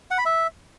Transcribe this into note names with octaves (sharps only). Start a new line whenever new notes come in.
F#5
B5
E5